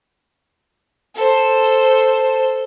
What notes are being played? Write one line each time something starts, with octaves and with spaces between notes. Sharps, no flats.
A4 C5